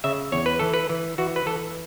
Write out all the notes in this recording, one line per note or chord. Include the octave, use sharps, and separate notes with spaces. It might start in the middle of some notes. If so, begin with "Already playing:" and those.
C#3 E5
E2 C#5
B4
E3 A4
B4
E3
E3 F#4
B4
E3 A4